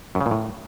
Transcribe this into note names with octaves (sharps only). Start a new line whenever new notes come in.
F#2
C#3
A#2
A2